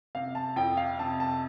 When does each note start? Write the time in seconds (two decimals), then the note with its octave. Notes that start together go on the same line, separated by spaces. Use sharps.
0.15 C3 F5
0.35 A5
0.56 F2 G5
0.77 F5
0.99 C3 A5
1.20 A5